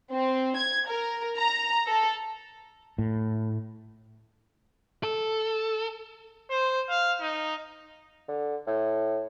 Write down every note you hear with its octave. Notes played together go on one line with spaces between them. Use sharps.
C4
G#6
A#4
A#5
A4
A2
A4
C5
F5
D#4
D3
A2